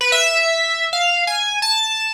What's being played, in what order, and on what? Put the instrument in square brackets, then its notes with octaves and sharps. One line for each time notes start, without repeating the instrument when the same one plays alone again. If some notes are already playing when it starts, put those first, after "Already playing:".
[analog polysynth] B4
E5
F5
G#5
A5